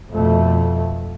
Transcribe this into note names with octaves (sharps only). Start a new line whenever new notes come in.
F2 B2 A3